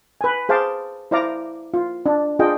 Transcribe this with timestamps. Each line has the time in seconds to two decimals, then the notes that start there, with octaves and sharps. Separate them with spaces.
0.21 B4 G#5
0.49 G#4 C5 F5 A5 D6
1.11 E4 C5 D5 F5 A#5 D6
1.74 F4
2.06 D4
2.39 D4 F4 G#4 D#5 G5